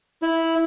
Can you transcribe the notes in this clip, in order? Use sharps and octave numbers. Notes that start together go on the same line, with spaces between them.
E4